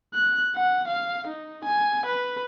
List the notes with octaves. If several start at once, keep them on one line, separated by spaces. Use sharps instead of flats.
F#6
F#5
F5
D#4
G#5
B4